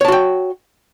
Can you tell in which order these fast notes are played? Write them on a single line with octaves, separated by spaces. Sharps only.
C#5 A5 F#4 G5